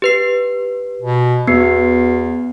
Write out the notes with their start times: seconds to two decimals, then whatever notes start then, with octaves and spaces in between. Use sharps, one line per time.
0.02 G4 B4 C7
1.02 B2
1.47 E2 B3 F#4 B4 C7